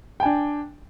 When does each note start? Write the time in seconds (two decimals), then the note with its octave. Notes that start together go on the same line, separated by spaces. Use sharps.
0.20 G5
0.23 G#5
0.26 D4